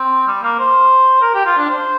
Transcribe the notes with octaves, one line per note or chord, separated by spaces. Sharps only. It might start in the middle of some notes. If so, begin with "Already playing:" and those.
Already playing: C4
G3
A#3
C5
A#4
G4
F4
D4
C5